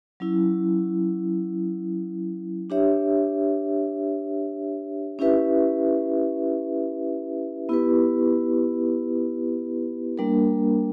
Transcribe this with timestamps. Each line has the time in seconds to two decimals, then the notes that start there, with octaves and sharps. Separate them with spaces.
0.20 F#3 C#4 E4
2.70 D4 G4 C#5 E5
5.19 C#4 E4 G4 B4 E5
7.69 B3 E4 G4 B4
10.18 G3 A#3 D4 A#4